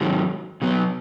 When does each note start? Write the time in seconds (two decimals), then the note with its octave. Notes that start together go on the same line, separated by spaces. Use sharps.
0.01 G#2 D#3 F#3
0.62 B2 F#3 B3